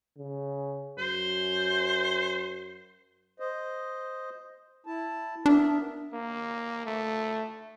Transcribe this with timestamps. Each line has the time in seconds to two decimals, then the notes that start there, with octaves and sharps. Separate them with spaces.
0.18 C#3
0.98 F#2 C5
3.40 C5 D#5
4.86 E4 A5
5.46 B3 D4 A#4 E5
6.13 A#3
6.86 A3